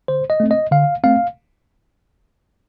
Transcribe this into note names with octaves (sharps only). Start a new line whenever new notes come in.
D3 C5
D#5
A3 C4
D#5
D3 F5
A3 C4 F5